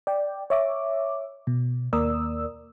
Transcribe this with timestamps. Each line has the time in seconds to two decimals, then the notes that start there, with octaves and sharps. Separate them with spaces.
0.07 D5 G5
0.50 C#5 E5 D6
1.47 B2
1.93 D#2 A#3 A#4 D5 D#6 E6